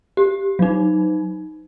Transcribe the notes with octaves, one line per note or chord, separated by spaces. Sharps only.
G4
F#3 D#4